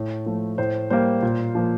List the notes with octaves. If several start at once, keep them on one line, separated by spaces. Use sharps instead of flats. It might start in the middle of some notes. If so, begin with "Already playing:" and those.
Already playing: A2
F3 A3
A2 C5
G3 A#3 C5
A#2
F3 A#3